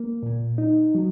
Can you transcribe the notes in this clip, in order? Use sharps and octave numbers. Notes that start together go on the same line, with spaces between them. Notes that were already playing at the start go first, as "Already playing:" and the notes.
Already playing: A#3
A#2
D#4
F#3